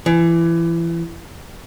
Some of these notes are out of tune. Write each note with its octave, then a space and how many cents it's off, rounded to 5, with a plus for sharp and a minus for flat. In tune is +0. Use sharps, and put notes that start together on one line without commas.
E3 +25